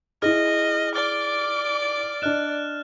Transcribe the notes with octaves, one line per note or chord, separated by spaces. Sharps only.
E4 G#4 D#5 F6
D5 D6 F6 A6 G7
D4 D#5 F6 F#6 E7